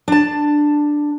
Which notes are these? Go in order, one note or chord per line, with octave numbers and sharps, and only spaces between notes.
D4 A5